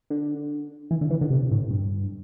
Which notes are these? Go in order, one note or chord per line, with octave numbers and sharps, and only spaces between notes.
D3
E3
D3
E3
D3
C3
A2
G2